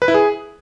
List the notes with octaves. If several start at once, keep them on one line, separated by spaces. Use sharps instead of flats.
B4
E4
G#4